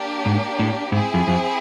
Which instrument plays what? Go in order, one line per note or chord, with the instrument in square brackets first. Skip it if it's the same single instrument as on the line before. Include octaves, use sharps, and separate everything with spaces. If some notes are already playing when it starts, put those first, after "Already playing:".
Already playing: [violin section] A#3 D4 G4
[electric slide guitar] G#2
A2
[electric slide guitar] G#2 [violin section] C4 E4 G#4
[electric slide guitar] F2
F2